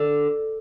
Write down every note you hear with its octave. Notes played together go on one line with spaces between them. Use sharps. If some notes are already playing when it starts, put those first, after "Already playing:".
Already playing: D3